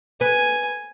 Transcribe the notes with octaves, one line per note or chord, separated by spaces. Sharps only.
B4 G#5